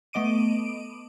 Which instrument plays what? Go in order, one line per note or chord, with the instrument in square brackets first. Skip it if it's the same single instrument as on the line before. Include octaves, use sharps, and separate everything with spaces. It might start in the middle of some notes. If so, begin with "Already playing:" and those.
[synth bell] A3 B3 D#5 D6 D7 D#7